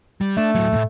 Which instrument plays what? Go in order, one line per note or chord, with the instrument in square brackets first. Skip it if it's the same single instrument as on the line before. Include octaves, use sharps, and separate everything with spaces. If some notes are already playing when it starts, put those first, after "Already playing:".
[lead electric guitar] G3
[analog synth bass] A3 [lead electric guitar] D4
[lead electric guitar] A2 F#3
E2 A2